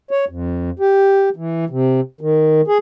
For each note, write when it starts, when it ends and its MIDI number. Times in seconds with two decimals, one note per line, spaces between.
0.11 0.25 73
0.29 0.70 41
0.79 1.29 67
1.36 1.65 52
1.70 2.01 48
2.21 2.61 51
2.68 2.78 68